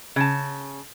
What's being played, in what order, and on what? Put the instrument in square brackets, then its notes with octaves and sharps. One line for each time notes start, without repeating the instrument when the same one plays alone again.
[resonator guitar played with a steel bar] C#3 A5